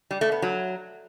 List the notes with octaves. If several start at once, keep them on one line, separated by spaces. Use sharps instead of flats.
G3
A3
B3
F#3